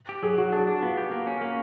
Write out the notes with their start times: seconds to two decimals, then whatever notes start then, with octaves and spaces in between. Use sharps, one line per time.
0.09 G4
0.23 F#3 G#4
0.38 F#3 F#4
0.52 D4 G#4
0.67 D4
0.82 B3 F4
0.97 G4
1.11 A#3
1.27 C#4
1.41 A#3